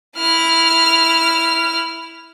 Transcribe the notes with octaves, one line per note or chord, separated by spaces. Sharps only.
E4 F6